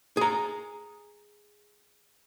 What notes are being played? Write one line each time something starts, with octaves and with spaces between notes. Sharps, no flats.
G#4 A#5